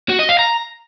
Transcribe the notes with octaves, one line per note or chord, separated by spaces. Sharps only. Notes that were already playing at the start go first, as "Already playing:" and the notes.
F#4
D#5
F5
A#5